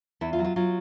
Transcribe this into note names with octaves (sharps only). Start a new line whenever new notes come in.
E2 E4
F4
F#3
F4
F#3 F4